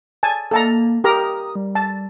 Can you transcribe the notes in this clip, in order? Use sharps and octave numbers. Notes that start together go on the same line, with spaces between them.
G#5 A5
A#3 A4 A5 A#5
G4 A#4 A#5 D#6
G3
A5